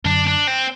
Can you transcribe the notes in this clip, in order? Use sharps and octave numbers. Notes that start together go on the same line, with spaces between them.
F#2 D3 F#3 D4
D4
C4